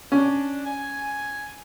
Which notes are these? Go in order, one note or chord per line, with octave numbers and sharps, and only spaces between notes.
C#4 D4
G#5